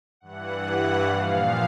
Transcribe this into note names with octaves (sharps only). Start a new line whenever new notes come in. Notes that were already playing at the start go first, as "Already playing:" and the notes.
G2 E3 F#5
A#2 F3 F5